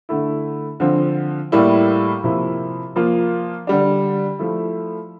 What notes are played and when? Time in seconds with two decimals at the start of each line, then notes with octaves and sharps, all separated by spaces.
0.09 D3 A3 E4
0.80 D3 F3 C4
1.52 A2 G3 A#3 E4
2.24 C3 F3 A#3 E4
2.96 F3 A#3 F4
3.67 D3 G3 D4
4.39 F3 A3 E4